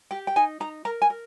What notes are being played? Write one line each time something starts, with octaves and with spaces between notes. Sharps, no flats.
G4 G5
G5
D#4 G#5
D#4 A#5
A#4 A#5
G#5
A#4